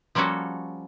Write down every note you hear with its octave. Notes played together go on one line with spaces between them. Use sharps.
F3 G3 A#3 C#4 F#4 A4